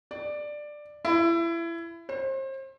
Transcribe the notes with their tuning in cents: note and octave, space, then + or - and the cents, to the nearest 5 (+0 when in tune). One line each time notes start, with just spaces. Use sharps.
D5 +10
E4 +25
C5 +35